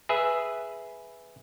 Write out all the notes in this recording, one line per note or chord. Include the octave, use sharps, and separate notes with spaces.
G#4 B4 E5